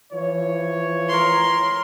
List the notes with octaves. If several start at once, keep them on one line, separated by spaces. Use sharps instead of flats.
E3 F3 C#5
A#4 C6